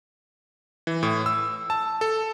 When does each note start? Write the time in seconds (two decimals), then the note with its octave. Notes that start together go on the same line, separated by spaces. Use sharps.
0.87 E3
1.03 A2
1.26 E6
1.70 A5
2.01 A4